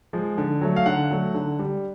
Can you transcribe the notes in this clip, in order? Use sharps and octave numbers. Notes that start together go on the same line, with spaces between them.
F3 G#3
D3
F#3 A3
F5
D3 F#5
F#3 A3
D3
G3